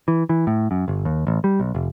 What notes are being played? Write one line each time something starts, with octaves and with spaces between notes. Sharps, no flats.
E3
E3
A2
F#2
G1
D#2
A1
G3
B1
F1